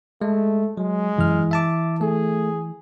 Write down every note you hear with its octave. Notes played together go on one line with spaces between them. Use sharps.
G#3 A3
F#3 G#3
F#2 E3 F6
E5 A5 D6
A3 G#4